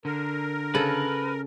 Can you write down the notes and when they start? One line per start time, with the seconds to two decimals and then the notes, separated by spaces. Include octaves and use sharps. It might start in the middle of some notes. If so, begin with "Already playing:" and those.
0.05 D3 A#4
0.75 C#3 A4 B4